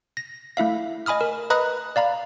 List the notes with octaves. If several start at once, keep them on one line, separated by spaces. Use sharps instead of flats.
A#6
A3 E4 E5 F5
D#5 G#5 B5 D#6 F6
A#4
B4 D#5 A#5 B5 D#6 F#6
D5 F5 A#5 B5